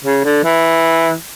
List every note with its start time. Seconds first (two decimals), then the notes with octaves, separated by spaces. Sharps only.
0.05 C#3
0.24 D3
0.44 E3